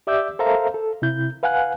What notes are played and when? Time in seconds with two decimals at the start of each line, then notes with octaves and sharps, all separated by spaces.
0.07 G4 D5 E5 D6 E6 G6
0.39 A4 A#4 C5 E5 F5 A#5
0.74 A4
1.02 C3 E4 G6
1.43 B4 F5 F#5 G#5 F#6